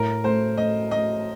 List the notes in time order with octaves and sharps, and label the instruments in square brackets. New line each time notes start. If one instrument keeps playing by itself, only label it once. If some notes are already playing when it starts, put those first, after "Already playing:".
Already playing: [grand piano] A2 [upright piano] A#4
[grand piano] A3 [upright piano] C5
[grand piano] A3 [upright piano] D#5
[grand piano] A3 [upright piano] D#5